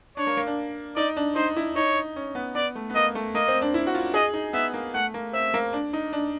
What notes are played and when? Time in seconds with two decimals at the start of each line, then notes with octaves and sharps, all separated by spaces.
0.17 D4 C#5
0.27 A#3
0.37 A#3
0.47 D4
0.96 D#4 D5
1.17 D4
1.36 D#4 C5
1.56 E4
1.76 D#4 C#5
2.16 C#4
2.35 B3
2.55 B3 D5
2.75 A3
2.90 B3
2.95 A#3 D#5
3.15 A3
3.34 A#3 D#5
3.48 C4
3.62 D4
3.74 E4
3.87 F#4
3.95 F4
4.14 G#4 D#5
4.34 D#4
4.53 B3 E5
4.73 A#3
4.94 A3 F#5
5.14 A#3
5.33 C4 E5
5.54 A#3
5.73 D4
5.93 D#4
6.13 D4